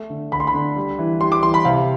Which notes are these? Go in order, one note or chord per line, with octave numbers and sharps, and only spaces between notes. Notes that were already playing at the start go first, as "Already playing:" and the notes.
Already playing: A3
D3
D2 B5
C6
B5
D3
G3
E3
G3 C6
D6
E3 C6
B5
C3 F5